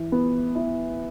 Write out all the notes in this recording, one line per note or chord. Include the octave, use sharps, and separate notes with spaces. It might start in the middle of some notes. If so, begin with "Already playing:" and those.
Already playing: E3
B3
E4